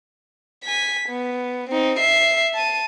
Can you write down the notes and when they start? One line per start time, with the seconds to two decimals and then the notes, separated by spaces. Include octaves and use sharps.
0.64 G#5 B6
1.09 B3
1.70 C4 D#4
1.99 E5 C7
2.54 A5 D#7